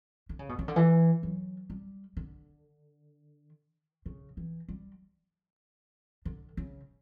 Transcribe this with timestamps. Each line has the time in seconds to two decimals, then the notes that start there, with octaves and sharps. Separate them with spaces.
0.29 D3
0.39 C#3
0.49 B2
0.59 C#3
0.68 D3
0.76 E3
1.23 F#3
1.70 G3
2.17 D3
4.06 C#3
4.37 E3
4.69 G3
6.25 D3
6.57 C#3